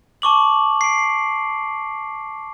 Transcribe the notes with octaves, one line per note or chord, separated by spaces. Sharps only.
A5 C#6 D6 F#7
C7 D7